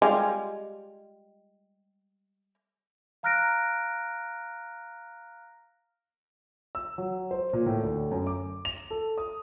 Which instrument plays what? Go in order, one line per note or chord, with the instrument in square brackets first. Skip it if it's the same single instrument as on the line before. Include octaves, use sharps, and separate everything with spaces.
[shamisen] G3 G#3 F4
[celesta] F5 A#5 F6 F#6 A#6 D7
[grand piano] E6
F#3
C5
A#2
A2
D2
F#2
D6
F7
A4
D#6